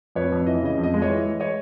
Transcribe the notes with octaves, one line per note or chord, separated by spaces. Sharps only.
F2 B4 C#5
F2
E3 D#5
C#3 D#5
F2
D#5
G#3
C#5 D#5
E3
G#3
C#5 D#5